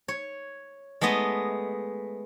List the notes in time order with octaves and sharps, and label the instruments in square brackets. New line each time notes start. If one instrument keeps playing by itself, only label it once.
[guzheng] C#5
G#3 A3 B3 D#5